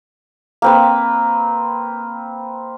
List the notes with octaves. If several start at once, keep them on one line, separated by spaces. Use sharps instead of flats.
A#3 C4 B4